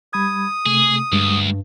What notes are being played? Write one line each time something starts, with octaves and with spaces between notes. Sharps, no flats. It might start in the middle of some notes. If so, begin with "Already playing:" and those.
G3 B5 D#6 G#6
C3 A3 G#4
D2 G2 G3 G#3